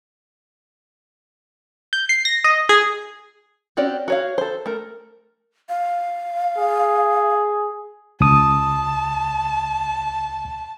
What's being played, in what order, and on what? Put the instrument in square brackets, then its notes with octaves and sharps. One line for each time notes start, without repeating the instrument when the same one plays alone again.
[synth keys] G6
C7
A#6
D#5
G#4
[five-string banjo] C4 C#4 F#4 G4 D5
F#4 C#5 F5
A4 C5
A3 A#4
[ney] F5
[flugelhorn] G#4
[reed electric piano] C#2 D#6 [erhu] A5